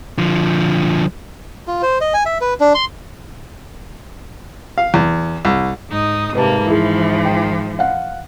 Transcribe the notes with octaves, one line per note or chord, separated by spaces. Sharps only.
D3 F3
F4
C5
D#5
G#5
E5
B4
D4
C6
F5
E2
C2
G#2 D#4 D#6
G#2 C3 G3 A#3 B4 A5
E3 F3 E4 G#4
G5
F5 F#5